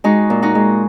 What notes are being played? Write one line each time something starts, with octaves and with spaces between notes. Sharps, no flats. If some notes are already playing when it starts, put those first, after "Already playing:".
G#3 D#4 F#4
A#2
D#4 F#4
G#3